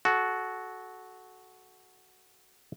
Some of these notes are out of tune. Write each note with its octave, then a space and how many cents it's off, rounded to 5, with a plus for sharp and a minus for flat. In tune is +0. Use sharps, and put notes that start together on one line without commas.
F#4 +0 A4 -25